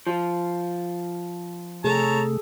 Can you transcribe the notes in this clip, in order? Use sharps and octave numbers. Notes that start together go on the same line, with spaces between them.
F3
C3 A3 G#4 A4 C#5 A5 A#5